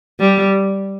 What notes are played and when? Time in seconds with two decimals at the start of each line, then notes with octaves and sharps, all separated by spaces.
0.20 G3